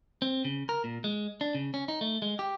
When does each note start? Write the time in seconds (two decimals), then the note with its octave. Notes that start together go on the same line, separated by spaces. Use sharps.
0.22 C4
0.45 C#3
0.69 A#4
0.84 A#2
1.04 G#3
1.41 D4
1.55 C#3
1.74 C#4
1.88 D#4
2.01 A3
2.22 G#3
2.39 G4